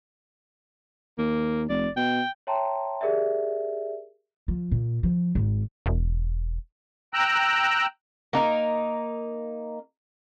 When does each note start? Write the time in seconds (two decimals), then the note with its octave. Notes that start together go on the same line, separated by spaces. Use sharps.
1.18 D#2 A#3
1.69 F1 D5
1.97 B2 G5
2.47 C#5 E5 G5 A5 A#5 C6
3.01 G4 G#4 A#4 D5 E5
4.48 F3
4.72 A#2
5.03 F3
5.35 G#1
5.86 E1
7.14 G5 A#5 E6 F#6
8.33 A#3 D#4 A#4